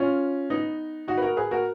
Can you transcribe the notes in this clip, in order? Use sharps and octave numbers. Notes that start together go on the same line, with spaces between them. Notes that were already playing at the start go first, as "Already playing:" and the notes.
Already playing: C#4 F4
B3 D#4
D#4 F#4
B4
F#4 A#4
G#4 B4
F#4 A#4